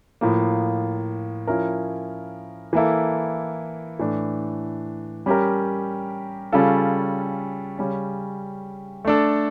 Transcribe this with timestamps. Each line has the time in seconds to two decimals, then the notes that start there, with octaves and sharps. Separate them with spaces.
0.21 A2 F3 A#3
1.47 F3 C#4 E4 A#4
2.73 E3 A#3 E4 A4
3.99 A2 E3 A3 D4
5.26 G3 C#4 G4 A#4
6.53 C#3 G3 C#4 F4 A4
7.79 C#3 G3 C#4
9.05 A3 D4 A4